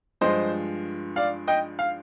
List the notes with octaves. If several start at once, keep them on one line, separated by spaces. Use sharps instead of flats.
G2 F3 G#3 C5 D#5
D5 F5
D#5 G5
F5